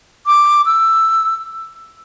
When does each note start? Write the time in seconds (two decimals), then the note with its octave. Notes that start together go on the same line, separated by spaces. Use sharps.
0.26 D6
0.66 E6